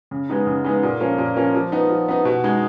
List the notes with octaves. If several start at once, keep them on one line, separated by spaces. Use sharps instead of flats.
C#3
G#3 B3 D#4
C#3
G#3 B3 D#4
A#2
F3 A#3 C#4
A#2
F3 A#3 C#4
F3
B3 D#4
F3
B3 D#4
B2
G#3 D#4